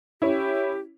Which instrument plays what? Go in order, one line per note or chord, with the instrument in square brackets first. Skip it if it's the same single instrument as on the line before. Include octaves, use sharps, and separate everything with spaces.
[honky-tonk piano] C#4 E4 [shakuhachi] G4